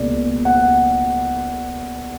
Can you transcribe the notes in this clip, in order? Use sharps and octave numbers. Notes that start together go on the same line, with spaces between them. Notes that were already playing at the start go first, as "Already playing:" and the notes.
Already playing: C#2 B2 A#3 D5
F#5